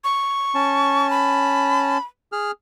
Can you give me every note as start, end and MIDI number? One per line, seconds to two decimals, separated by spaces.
0.04 1.10 85
0.55 1.98 61
0.55 1.98 81
1.10 2.04 83
2.32 2.51 68
2.32 2.51 89